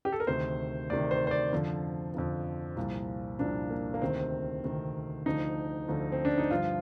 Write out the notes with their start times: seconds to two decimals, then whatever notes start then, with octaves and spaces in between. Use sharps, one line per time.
0.05 G4
0.12 A4
0.20 A#4
0.27 D2 C3 D#3 C5
0.90 D2 C3 D#3 D5
1.11 C5
1.27 C5
1.31 D5
1.52 F2 D3 F3
2.14 F2 D3 F3
2.77 C2 A#2 F3
3.39 C2 A#2 F3 D4
3.70 A#3
3.94 A#3
4.02 D2 C3 D#3 C4
4.64 D2 C3 D#3
5.26 D2 D3 F3 D#4
5.89 D2 D3 F3
6.12 C4
6.25 D4
6.38 D#4
6.51 G2 D3 F3 F4